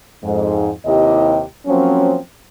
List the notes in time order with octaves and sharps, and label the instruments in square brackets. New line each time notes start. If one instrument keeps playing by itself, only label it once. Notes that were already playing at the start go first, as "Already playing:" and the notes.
[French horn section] F2 G#2
D#2 C3 E4 G4 D#5
F3 F#3 A#3 C4 C#4